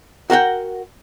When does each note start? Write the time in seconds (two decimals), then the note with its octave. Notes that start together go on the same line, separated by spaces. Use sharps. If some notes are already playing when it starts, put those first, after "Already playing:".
0.30 F#4 A#4 F#5 G5